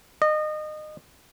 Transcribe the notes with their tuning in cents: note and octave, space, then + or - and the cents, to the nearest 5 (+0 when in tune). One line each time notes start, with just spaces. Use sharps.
D#5 -25